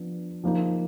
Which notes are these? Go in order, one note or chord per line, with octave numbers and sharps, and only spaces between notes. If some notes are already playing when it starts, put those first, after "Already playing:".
Already playing: F3 B3 D4
F3 A#3 D#4